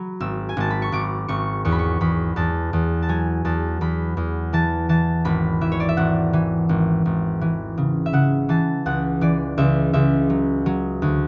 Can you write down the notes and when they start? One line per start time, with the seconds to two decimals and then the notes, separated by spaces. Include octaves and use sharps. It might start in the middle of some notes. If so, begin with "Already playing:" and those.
Already playing: F#3 B5
0.20 G#1 E6
0.49 G#5
0.57 G#1 A5
0.70 B5
0.82 C#6
0.92 G#1 D6
1.28 G#1 C#6
1.65 E2 C#6
1.72 B5
1.79 C#6
2.01 E2 B5
2.36 E2 A5
2.73 E2
3.02 A5
3.09 F#3 G#5
3.45 E2 A5
3.81 E2 B5
4.17 E2
4.53 E3 A5
4.89 E3 A5
5.25 G#1 B5
5.61 E3 E5
5.72 C#5
5.80 D5
5.89 E5
5.97 G#1 F#5
6.33 E3
6.69 G#1
7.06 G#1
7.41 E3
7.78 C#3
8.06 E5
8.13 C#3 F#5
8.49 E3 A5
8.86 C#2 F#5
9.21 E3 D5
9.58 C#2 E5
9.93 C#2 E5
10.30 F#3
10.66 F#3
11.02 D2